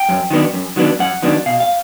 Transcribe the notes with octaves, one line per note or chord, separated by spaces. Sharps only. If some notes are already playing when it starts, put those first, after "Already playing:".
Already playing: G5
F#2
D#3 F#3 B3 D4
F#2
D#3 F#3 B3 D4
F#2 F#5
D#3 F#3 B3 D4
B2 F5
F5